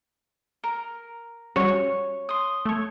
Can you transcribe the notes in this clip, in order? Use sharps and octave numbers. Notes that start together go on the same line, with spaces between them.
A#4
G3 C#4 F#4 C#5
C6 D#6
A3 C#5